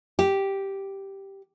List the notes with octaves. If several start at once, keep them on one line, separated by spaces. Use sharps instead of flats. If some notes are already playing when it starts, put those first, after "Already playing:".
G4